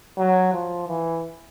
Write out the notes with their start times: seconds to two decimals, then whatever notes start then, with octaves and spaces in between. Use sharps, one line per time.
0.18 F#3
0.53 F3
0.88 E3